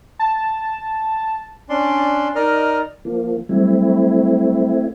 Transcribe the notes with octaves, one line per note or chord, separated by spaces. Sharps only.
A5
C#4 D4 D5 C6
D#4 A#4 D5 D#5 F6
F3 A#3
F#3 G3 A3 C4 E4